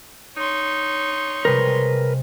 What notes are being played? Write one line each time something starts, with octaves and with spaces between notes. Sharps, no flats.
D#4 C#5 C6
C3 G3 G#3 A#4 B4